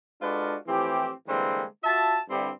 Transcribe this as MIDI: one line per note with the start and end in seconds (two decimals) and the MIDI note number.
0.22 0.56 56
0.22 0.56 62
0.22 0.56 65
0.22 0.56 66
0.22 0.56 69
0.22 0.56 71
0.67 1.11 45
0.67 1.11 52
0.67 1.11 53
0.67 1.11 60
0.67 1.11 67
1.28 1.65 50
1.28 1.65 52
1.28 1.65 55
1.28 1.65 56
1.28 1.65 58
1.28 1.65 60
1.84 2.19 65
1.84 2.19 66
1.84 2.19 76
1.84 2.19 81
2.29 2.51 43
2.29 2.51 50
2.29 2.51 55
2.29 2.51 60
2.29 2.51 64
2.29 2.51 67